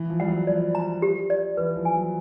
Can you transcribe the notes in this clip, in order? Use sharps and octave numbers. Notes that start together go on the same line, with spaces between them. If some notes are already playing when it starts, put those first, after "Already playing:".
Already playing: E3
F3
G3 F#5
F#3
F3 D5
A#5
G4
D5
E3 B4
F3
G#5
F#3